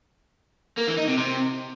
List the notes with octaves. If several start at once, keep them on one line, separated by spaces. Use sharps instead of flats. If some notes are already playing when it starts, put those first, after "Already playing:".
A#3
E3
D#4
C3
C3